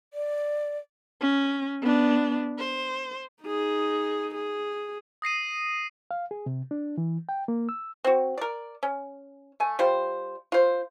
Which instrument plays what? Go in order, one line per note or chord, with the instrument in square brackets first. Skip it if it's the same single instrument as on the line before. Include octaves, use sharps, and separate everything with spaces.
[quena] D5
[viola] C#4
B3 D4
C5
D#4 G#4
G#4
[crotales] D#6 A#6 C7 D#7
[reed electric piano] F5
G#4
C3
D4
E3
G5
A#3
E6
[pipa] C4 F#4
A#4 D5
C#4
A3 G#5
G3 F4 C5
F4 C5